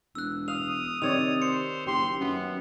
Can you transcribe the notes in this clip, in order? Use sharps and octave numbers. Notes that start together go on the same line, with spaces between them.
E1 E6 F#6
F5 D#6 F7
C3 D#3 C#5 D5 D#6 F7
C5 C#7
F#1 G4 C6
F#2 B3